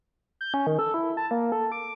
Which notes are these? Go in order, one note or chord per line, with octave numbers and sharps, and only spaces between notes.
G6
C#4
D#3
A4
E4
A5
A#3
A4
D6